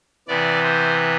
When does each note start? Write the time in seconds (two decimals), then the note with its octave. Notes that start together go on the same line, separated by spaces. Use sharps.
0.28 C3 E3 B3 D5
0.64 C5